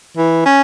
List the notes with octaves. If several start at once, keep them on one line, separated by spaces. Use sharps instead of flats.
E3
C#4